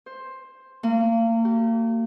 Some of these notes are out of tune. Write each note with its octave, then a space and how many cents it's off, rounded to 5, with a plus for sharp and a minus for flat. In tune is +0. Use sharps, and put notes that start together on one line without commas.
C5 +10
A#3 -35
G4 -40